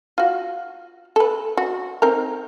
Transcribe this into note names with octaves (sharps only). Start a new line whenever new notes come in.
F4 F#4
A4 B4
F#4
C4 D#4 A#4